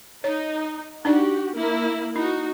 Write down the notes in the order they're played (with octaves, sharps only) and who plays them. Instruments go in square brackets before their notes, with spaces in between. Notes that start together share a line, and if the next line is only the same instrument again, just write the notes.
[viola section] D#4 [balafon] C#5
[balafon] D4 D#4 D5 [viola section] F#4 G4
[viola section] A#3 E4 A#4
[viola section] D#4 F#4 [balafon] E4